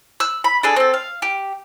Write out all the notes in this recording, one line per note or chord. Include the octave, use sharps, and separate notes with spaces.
E6 F#6
B5
D4 G#4 A4
C4 A4
F5
G4